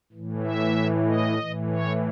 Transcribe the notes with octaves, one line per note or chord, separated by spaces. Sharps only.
A2 E3
E5
D#5
A2 E3
C#5